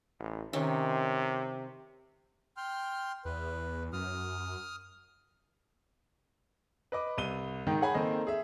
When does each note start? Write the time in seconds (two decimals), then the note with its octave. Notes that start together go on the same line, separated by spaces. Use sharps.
0.19 A1
0.53 C3 D#3 C#4
2.57 G5 C6 F6
3.25 E2 B4
3.93 F#2 D#6 F6
6.92 B4 D#5 D6
7.18 C2 D#7 G7
7.67 G#2 D#3 D#4 G5
7.81 G#4 C#5 F#5 G#5 B5
7.94 D#3 A#3 C4 A4 D#5
8.27 G#4 E5